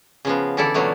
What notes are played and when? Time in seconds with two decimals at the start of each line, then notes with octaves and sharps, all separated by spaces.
0.25 C#3 F3 B3
0.57 D3 E3 E4 A4 D5
0.74 A#2 D3 E3 F#3 A3 B3